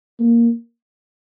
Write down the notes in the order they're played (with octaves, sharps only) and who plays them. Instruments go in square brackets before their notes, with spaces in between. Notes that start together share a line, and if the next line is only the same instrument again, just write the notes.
[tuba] A#3